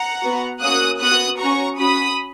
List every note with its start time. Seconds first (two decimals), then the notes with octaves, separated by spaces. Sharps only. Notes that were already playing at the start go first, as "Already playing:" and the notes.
Already playing: F#5 A#5
0.21 B3 F#4
0.61 A#3 C#4 F#4 D#6 F#6
1.00 B3 F#4 D#6 F#6
1.40 C#4 F#4 A#5 C#6
1.79 C#4 F#4 B5 D#6